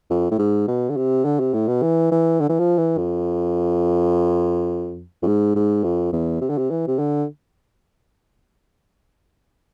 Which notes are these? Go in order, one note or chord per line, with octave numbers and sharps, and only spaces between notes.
F2
A2
G#2
B2
D3
C3
D3
C3
A2
B2
E3
E3
D3
E3
F3
E3
F2
F2
G#2
G#2
F2
E2
C3
D3
C3
E3
C3
D3